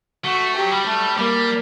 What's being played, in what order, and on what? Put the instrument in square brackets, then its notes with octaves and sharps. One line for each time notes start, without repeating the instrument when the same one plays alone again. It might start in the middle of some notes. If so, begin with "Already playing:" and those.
[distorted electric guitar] A3 [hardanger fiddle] F#4
[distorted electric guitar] F#3 [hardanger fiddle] G4
[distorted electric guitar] G3
[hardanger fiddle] A3
[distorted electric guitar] G3 [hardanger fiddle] A#3